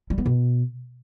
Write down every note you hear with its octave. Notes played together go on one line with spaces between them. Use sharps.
G3
B3
B2